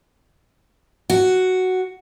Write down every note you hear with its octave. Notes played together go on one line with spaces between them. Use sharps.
F#4